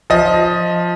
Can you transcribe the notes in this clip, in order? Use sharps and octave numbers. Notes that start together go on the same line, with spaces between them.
F3 D#5